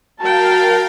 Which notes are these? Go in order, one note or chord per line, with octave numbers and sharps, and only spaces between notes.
F#3 A#4 F5 G5 A5